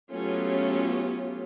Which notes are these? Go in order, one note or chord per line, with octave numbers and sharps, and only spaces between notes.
F#3 A3 B3 C#4 F4 G4